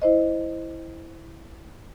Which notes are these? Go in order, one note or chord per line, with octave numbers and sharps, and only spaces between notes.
E4 C5 D#5